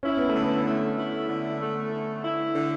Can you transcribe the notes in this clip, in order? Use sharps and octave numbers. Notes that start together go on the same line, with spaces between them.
C#4 E4
B3
A3
D3
B3
A3
E4
D3
A3
D3
E4
D3